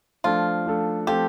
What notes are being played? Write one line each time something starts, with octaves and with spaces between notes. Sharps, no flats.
F3 A3 D4 F4 A4
F3 A3 D4 A4
F3 A3 C4 F4 G4 A4